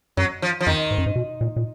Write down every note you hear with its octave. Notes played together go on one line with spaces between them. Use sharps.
F#2 F#3
F3
F3
F2 D#3
G#2
F#2
G#2
B2
A#2
A#2